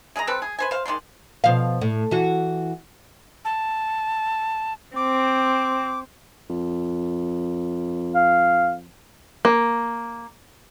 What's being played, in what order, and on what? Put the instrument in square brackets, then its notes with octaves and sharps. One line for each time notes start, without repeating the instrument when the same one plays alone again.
[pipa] G#3 G#4 D5 A#5
G3 C4 A4 B4
G#4
B4 C5 G#5
C5 F5
D#3 G#3 D5 C6
[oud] B2 F3 F5
A2
E3 F#4
[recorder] A5
[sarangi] C4 [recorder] D6
[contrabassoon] F2
[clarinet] F5
[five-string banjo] A#3